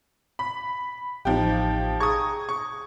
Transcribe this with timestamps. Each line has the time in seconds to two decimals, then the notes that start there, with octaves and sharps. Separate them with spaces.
0.39 B5
1.25 A1 F3 D#4 G4
2.00 G#4 A#5 C#6 D#6 G#6
2.49 C#6